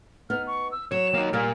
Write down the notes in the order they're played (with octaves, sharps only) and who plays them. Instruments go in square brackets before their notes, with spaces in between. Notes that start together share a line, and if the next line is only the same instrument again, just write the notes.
[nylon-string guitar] B3 D#4 [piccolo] F6
[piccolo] C#6
E6
[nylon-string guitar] F#3 [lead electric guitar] C#5 [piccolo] E7
[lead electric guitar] A#3 D#4
[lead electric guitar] A#2 [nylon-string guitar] G3 A#3 [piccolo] F6